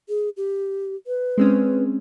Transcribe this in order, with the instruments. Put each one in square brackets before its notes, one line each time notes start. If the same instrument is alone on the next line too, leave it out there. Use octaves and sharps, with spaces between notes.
[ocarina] G#4
G4
B4
[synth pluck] G#3 C4 C#4